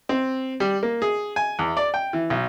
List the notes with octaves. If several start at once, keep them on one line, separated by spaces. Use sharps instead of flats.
C4
G3
A#3
G#4
G#5
E2
D5
G5
E3
B1